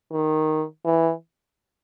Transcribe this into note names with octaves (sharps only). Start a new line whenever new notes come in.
D#3
E3